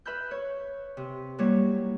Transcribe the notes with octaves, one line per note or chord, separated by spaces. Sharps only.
B4 E5 B5 F6 G6
C#5
C3
F#3 G3 A#3 E4 C#5